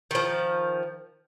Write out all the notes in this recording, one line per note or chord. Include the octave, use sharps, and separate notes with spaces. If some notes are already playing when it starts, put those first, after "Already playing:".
D#3 F3